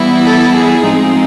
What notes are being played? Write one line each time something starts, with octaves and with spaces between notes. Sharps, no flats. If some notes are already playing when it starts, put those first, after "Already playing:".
Already playing: E3 G3 B3 E4
A4
G#4
A2 F3 G#3 C4 D#4